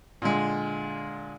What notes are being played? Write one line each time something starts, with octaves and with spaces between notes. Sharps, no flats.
A#2 D3 G#3